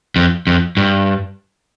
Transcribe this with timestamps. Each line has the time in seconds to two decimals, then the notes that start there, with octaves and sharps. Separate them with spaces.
0.16 F2
0.47 F2
0.77 G2